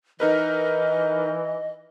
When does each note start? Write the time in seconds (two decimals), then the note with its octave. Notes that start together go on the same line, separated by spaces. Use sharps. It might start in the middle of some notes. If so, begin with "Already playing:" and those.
0.20 E3 D#4 A#4 B4 D#5